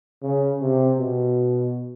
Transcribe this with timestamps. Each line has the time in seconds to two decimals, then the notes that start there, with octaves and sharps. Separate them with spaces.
0.22 C#3
0.61 C3
0.98 B2